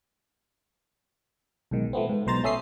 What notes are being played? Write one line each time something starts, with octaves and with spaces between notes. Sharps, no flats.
B1 G#2 D#3
F3 A3 B3 C4
G#2
B1 B2 C5 A#5 A6
A3 C#4 E5 D#6 C7